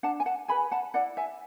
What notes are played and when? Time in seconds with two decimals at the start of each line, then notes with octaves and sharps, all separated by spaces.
0.03 D4 F#5 A5
0.20 G#5
0.26 F#5 A5
0.48 G#4 B4 G#5 B5
0.71 F#5 A5
0.94 E4 D5 F#5
1.17 E5 G#5